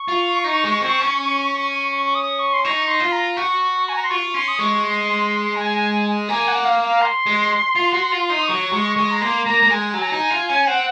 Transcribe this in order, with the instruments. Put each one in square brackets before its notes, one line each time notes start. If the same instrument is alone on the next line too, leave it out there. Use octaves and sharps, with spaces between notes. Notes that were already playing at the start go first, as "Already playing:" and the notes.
Already playing: [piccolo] C#6
[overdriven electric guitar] F4
D#4
G#3
C4
C#4
[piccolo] C#6
C#6
D#6
C#6
C6
[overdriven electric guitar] D#4 [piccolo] C#6
[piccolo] C6
[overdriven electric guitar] F4
[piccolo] A#5
[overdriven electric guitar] F#4 [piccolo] C#6
[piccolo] G#5
A#5
C6
[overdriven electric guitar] F4 [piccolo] C#6
[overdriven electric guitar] C#4 [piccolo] C6
[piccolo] D#6
[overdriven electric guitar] G#3 [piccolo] C#6
[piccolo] C6
G#5
[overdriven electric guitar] A#3 [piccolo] G#5
[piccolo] F#5
F5
F5
C6
[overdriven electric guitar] G#3
F4
F#4
F4
D#4
[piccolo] D#6
[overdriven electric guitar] F#3 [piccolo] C#6
[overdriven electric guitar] G#3
G#3
[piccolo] A#5
[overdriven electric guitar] A#3 [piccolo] C6
[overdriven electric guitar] A#3 [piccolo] A#5
[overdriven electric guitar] A#3
[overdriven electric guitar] G#3 [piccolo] G#5
[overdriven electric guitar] F#3 [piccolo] G#5
[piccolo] A#5
[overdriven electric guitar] D#4 [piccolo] G#5
[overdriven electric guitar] F4
C#4
[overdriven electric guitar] C4 [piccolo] F#5